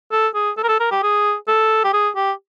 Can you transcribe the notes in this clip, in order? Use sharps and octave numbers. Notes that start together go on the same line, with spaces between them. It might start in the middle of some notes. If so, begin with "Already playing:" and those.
A4
G#4
A4
A#4
A4
A#4
G4
G#4
A4
G4
G#4
G4